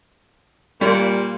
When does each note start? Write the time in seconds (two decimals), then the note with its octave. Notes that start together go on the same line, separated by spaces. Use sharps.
0.81 A#2 G3